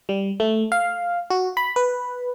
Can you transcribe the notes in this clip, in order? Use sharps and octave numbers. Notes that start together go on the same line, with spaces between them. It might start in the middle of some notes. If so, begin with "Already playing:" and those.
G3
A3
F5
F#4
B5
B4